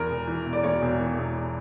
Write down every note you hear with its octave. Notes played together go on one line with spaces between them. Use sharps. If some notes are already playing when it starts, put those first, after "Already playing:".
Already playing: E2 A#4
E1
E3
E1
D5
E2 C#5
E1
E3
E1